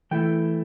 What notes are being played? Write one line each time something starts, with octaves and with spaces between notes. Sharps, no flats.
E3 A3 E4 G5